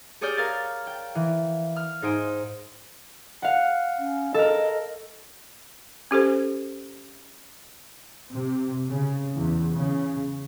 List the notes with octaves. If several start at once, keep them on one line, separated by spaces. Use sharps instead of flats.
G4 G#4 C#5 D5 F6 G6
A#4 F5 F6 G#6 A6
G5
E3
F6
G#2 D#4 C5 G#5 D7
F5 F#5
C#4
A4 A#4 D#5
C#4 G4 A4 C5
C3
C#3
E2
C#3